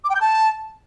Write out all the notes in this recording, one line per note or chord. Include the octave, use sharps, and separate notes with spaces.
D6
G5
G6
A5